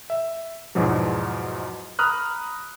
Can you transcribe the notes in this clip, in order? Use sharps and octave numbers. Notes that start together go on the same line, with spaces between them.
E5
E2 G#2 B2 F3 F#3
A#5 B5 D#6 F6 F#6